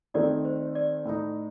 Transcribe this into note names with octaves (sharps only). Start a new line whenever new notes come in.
D#3 A3 C4 D#4 D5
C5
D5
A2 A3 D#4